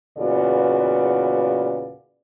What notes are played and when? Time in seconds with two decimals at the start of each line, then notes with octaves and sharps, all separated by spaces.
0.18 E2 A#2 C#3 F#4 B4 D5